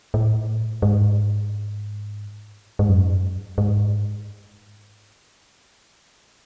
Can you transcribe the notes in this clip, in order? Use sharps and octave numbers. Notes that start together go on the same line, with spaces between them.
A2
G#2
G#2
F#2
G#2